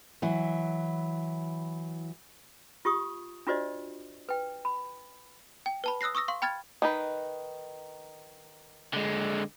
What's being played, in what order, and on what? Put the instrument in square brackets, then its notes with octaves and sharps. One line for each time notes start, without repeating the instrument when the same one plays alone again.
[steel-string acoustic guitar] E3 F#3 E4
[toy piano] F4 G4 C#6 D#6
D4 F4 F#4 C5 D5 D#5
B4 G5
B5
[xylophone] G5
B4 A5 B5
D#6 E6 F#6 A#6 C7
C#6 D#6 E6 A#6
F5 C6 C#6
G5 B5 F6 G#6 A6
[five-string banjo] D#3 D#4 B4
[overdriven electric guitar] D3 G#3